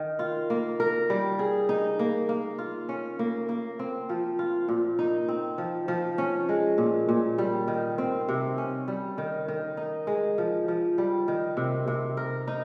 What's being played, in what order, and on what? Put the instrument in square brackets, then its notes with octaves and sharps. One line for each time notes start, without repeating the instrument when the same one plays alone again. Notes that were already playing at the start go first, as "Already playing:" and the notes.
Already playing: [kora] D#3
F4
A#3
A#4
G3
G#4
D#4
A#3
A#3
F4
C#4
A#3
A#3
C4
F3
F4
A#2
D#4
C4
F3
F3
C#4
G#3
A#2
A#2
G3
D#3
C4
C3
C#4
G3
D#3
D#3
D#4
G#3
F3
F3
G3
D#3
C3
C3
A#4
D#4